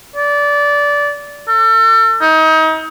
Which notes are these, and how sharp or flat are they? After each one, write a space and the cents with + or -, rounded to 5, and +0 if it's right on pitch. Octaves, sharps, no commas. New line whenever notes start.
D5 -20
A4 +35
D#4 +30